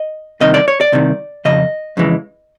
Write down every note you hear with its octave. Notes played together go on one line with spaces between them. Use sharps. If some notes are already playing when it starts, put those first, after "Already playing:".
Already playing: D#5
C2 C3 D#3 D#5
D5
C#5
D5
C2 C3 D#3
F2 C#3 D#5
F2 C#3 E3 G#3